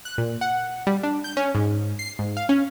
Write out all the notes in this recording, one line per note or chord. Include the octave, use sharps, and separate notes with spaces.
F#6
A#2
F#5
G3
D4
G6
C#4
G#2
C7
G#2
F5
C#4